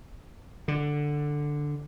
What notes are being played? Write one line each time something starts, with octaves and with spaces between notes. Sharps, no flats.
D3